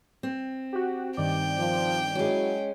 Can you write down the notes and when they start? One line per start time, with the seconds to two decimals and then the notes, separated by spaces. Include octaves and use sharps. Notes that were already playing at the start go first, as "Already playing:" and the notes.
0.23 C4
0.73 F#4 G4
1.17 G2 D#3 D5 G5
1.59 F3
2.15 F#3 G#3 C#4 E4 F#4